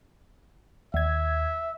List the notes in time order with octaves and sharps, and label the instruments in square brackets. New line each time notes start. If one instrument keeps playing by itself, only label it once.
[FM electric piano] D#2 G#6 [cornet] E5